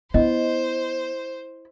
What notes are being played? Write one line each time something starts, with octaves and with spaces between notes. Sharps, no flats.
B3 E4 C5 D#5